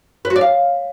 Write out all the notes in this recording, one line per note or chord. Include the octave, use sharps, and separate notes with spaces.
B4
F#4
D5
F5